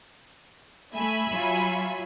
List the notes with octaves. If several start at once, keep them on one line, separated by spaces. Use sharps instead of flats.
A3 E5 G#5 B5
F#3 F4